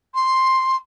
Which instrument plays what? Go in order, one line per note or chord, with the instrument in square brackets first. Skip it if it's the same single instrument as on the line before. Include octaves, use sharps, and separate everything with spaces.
[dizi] C6